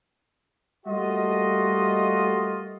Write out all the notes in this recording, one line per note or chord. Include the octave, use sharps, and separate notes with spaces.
G3 A3 A#3 F4 F#4 D#5